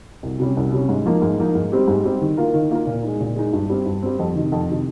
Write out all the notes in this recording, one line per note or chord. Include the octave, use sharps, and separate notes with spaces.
C2
C3 G3 C#4
C2
C3 G3 C#4
G#2
F3 A#3 D#4
G#2
F3 A#3 D#4
G#2
G3 C4 G4
G#2
G3 C4 G4
D#3
A#3 F4 A#4
D#3
A#3 F4 A#4
A#2
G#3 D#4
A#2
G#3 D#4
G2
G3 C4
G2
G3 C4
F2
C3 D#3
F2
C3 D#3